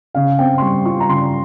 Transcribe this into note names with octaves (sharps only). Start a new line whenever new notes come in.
C#3 F5
C4 G5
C6
G3 C#6
F4 C#6
A#5
C#3 C6